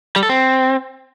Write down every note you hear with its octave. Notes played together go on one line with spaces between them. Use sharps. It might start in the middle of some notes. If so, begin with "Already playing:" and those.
G3
A4
C4